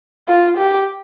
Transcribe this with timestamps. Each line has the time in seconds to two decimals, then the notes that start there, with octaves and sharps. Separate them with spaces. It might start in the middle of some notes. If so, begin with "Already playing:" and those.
0.28 F4
0.57 G4